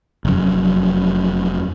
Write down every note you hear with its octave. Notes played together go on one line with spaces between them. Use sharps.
F1 F#2